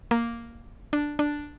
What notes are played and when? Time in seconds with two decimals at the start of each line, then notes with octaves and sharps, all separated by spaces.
0.11 A#3
0.93 D4
1.19 D4